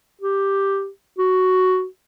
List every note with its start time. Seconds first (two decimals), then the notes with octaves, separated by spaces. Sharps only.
0.21 G4
1.18 F#4